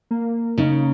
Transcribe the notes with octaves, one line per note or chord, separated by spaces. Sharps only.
A#3
C#3 C#4 D#4